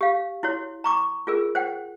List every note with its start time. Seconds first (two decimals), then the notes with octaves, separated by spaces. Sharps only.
0.01 G4 F5
0.43 E4 F#4 C#5
0.84 A#5 C#6 D6
1.27 F4 G#4 A#4
1.55 C5 F#5 G5